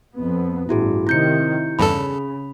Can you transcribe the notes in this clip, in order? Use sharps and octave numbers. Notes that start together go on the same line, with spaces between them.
F2 B3
A1 G2 E4 F#4 G#4
C3 D#3 E4 G6 C#7
E2 G2 C#3 A4 B5